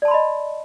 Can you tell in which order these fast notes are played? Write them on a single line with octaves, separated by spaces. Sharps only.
D5 A5 C6 B5 D#5